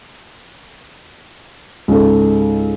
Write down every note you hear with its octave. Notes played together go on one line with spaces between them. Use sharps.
C#2 G#2 A4